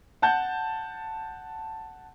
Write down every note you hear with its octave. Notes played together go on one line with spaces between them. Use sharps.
F#5 A5 G6